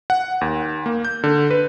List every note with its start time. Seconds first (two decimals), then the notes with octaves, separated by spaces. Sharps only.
0.10 F#5
0.41 D#2
0.86 A#3
1.05 G6
1.24 D3
1.51 B4